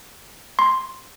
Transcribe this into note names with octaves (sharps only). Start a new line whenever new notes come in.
C6